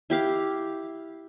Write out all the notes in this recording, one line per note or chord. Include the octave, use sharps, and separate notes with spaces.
E4 G4 F5